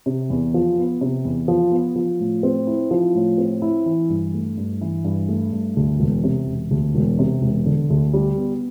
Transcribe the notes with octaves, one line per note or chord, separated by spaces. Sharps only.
C3
E2
F3
B3
C3
E2
F3
B3
F3
A2
C4
E4
F3
A2
C4
E4
E3
G2
A3
G2
E3
G2
A3
G2
D2
E1
C3
E1
D2
E1
C3
E1
D3
D2
G3
B3